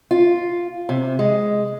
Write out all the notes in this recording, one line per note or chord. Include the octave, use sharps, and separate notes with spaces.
F4
C3
G#3